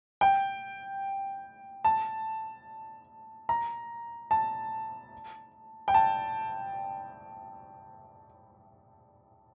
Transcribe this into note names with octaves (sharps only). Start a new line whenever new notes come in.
G5
A5
A#5
A5
G5
A5